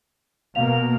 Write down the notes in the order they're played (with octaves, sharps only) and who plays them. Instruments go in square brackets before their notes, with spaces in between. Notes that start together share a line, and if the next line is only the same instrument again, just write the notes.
[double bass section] B2 A#3 [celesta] F5 F7